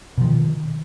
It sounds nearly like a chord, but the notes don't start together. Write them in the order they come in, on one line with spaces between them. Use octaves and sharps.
B2 F3 D#3